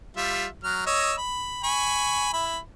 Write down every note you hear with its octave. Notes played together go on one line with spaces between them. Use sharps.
G3 F4 E5
F#3 F6
C#5 D#5 E6
B5
G#5 B5 C#6
E4 B5